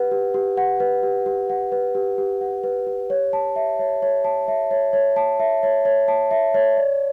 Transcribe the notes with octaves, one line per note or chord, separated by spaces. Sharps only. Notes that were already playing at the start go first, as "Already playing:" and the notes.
Already playing: G4 B4 F#5
G4
G4
F#5
B4
G4
G4
F#5
B4
G4
G4
F#5
B4
G4
C#5
A5
E5
C#5
C#5
A5
E5
C#5
C#5
A5
E5
C#5
C#5
A5
E5
C#5
D5